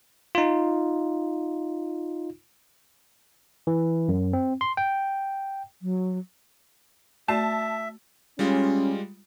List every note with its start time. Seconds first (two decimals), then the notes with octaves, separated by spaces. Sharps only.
0.35 D#4 F4
3.67 E3
4.08 F#2
4.33 C4
4.61 C6
4.77 G5
5.82 F#3
7.28 A3 F#4 D5 E5 A5
8.39 G3 G#3 C#4 F4